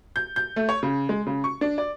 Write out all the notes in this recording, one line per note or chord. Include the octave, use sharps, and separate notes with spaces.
G6
G6
A3
C#5
C#3
G#3
C#3
C#6
D4
D5